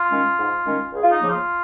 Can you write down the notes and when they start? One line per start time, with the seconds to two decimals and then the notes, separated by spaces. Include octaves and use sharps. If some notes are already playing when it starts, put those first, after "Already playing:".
Already playing: F4
0.11 D#3 G#3 C#4
0.38 G#2
0.66 D#3 G#3 C#4
0.93 C#2 G#4
1.03 F4
1.12 D#4
1.21 C#3 F3 A#3
1.30 F4